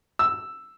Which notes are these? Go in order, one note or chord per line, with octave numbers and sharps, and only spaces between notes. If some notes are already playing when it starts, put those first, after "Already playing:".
E6